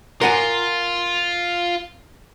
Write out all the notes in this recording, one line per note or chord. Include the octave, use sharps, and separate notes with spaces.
F4 A#4 F#5 G#5